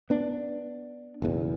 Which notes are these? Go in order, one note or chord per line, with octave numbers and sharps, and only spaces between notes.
B3 D4
F#1 B1 E2